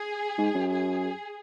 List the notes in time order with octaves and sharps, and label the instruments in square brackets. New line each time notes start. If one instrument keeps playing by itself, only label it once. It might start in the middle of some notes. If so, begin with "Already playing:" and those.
Already playing: [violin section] G#4
[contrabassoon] G#2
F#2
[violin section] G#4